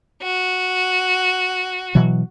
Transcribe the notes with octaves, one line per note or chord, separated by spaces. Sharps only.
F#4
B2 E3 F#3